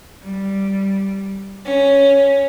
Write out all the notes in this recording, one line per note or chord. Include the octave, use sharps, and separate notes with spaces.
G3
C#4